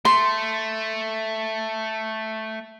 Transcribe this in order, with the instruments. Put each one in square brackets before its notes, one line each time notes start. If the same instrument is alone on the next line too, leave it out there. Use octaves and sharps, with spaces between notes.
[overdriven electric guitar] A3 [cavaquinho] C6